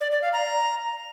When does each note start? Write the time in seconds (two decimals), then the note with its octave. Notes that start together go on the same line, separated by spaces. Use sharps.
0.01 D5
0.11 D5
0.22 F5
0.33 A#5